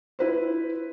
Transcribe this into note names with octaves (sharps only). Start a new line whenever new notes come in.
E4 B4 C5